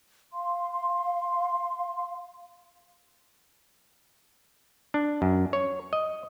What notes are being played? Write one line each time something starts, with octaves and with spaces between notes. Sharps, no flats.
F5 C6
D4
F#2
C#5
D#5